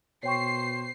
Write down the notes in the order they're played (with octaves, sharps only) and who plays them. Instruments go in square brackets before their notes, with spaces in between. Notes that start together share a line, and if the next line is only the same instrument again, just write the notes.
[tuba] B2 [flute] C5 [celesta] C#5 G5 C#6 [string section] C7